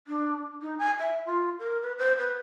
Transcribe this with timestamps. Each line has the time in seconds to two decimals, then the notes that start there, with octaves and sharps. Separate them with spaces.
0.07 D4
0.62 D#4
0.79 G#5
0.99 E5
1.26 F4
1.59 A#4
1.82 B4
1.98 C5
2.18 B4